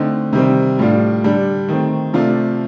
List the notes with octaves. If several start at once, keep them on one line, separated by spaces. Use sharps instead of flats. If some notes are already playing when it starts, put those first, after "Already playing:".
Already playing: D3 A3 C4 D#4
C3 D#3 G3 C4
A2 G3 D4 F4
D3 G3 D4
D#3 A3 C4
C3 F3 A3 D4 F4